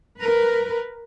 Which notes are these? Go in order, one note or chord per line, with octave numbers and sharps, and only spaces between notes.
A#4 B4